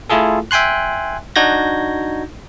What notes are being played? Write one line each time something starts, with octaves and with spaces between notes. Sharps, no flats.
A3 E4 F4 G#4 A4
E5 G5 G#5 C6 F#6
D4 D#4 F#4 G6 G#6 A#6